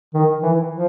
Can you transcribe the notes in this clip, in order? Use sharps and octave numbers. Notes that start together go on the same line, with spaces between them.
D#3
E3
F3